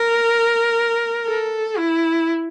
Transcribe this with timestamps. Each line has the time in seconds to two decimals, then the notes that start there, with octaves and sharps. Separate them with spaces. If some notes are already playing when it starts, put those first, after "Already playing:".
Already playing: A#4
1.26 A4
1.78 E4